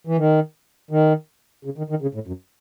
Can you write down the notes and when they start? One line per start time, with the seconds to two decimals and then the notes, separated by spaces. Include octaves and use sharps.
0.07 E3
0.18 D#3
0.91 D#3
1.65 C#3
1.78 D#3
1.90 D#3
2.02 C#3
2.14 A2
2.27 F#2